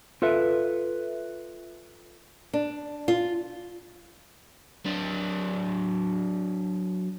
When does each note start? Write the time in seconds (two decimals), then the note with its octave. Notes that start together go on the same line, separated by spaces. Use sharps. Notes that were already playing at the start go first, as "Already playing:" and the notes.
0.22 F4 A4 B4 E5
2.53 D4
3.08 F4
4.86 F#3 D4